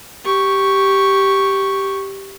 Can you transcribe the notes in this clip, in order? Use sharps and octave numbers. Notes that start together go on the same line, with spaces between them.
G4 C#6